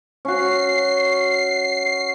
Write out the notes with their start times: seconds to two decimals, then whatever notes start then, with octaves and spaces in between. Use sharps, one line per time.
0.25 C#4 F#4 C7